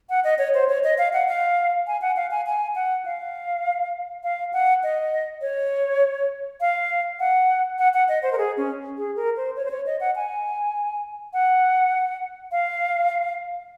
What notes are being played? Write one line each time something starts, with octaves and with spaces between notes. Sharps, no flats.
F#5
D#5
C#5
C5
C#5
D#5
F5
F#5
F5
G#5
F#5
F5
G#5
G#5
F#5
F5
F5
F#5
D#5
C#5
F5
F#5
F#5
F#5
D#5
C5
A#4
G#4
C#4
G#4
A#4
C5
C#5
C5
C#5
D#5
F#5
G#5
F#5
F5